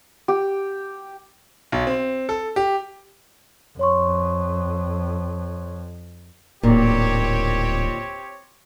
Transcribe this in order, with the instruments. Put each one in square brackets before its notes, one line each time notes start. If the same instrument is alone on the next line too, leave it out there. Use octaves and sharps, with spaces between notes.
[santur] G4
[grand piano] B1
C4
A4
G4
[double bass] F2 [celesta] C#5 C6 C#6
[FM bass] D1 [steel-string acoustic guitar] A#2 D#3 [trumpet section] C4 G4 C#5